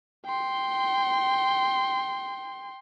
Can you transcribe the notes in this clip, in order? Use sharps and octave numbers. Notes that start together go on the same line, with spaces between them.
G5 C6